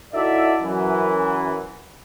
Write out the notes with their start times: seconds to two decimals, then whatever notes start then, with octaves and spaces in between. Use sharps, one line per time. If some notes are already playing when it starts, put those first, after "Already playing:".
0.13 D#4 E4 F#4 A4 D5 E5
0.61 F#2 E3